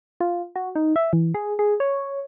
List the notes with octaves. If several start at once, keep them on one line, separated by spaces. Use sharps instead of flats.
F4
F#4
D#4
E5
E3
G#4
G#4
C#5